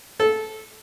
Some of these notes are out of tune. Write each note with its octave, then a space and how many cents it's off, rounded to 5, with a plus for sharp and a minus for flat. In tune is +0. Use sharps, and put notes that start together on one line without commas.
A4 -15